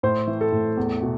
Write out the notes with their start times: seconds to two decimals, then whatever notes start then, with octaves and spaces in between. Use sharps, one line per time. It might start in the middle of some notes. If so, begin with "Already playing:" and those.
0.03 A2 C5
0.27 E3
0.41 A4
0.52 A2
0.77 E2
1.03 B2